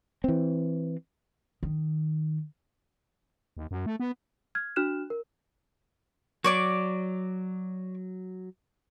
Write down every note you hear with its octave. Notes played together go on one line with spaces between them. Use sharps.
E3 C4
D#3
D#2
F#2
A3
B3
F6 G#6
D4 F#4 F6 F#6 E7
A#4
F#3 C#5 D5 D6